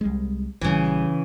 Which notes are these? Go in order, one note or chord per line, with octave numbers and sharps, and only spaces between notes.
C2 G3 G#3
A#1 C#3 E3 G3